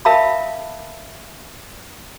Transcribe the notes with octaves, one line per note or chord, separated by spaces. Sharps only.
A#4 E5 F5 A5 B5